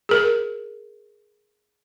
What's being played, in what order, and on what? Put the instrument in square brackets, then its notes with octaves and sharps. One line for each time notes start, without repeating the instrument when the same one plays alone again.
[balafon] G#4 A#4